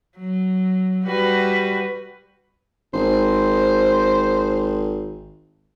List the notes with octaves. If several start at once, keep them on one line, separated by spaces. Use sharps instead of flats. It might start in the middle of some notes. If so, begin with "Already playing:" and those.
F#3
G3 F#4 B4
G#1 C5